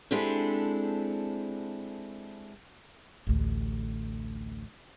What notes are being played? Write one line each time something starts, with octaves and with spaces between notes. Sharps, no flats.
G#3 C4 D4 E4 G4 A4
A1 D2